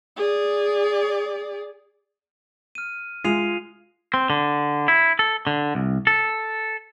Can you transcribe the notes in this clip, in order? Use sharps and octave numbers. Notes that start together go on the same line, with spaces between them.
G#4 D5
F6 D#7
G#3 F4 C7 D#7 F7
C4
D3
E4
A4
D3
C2
A4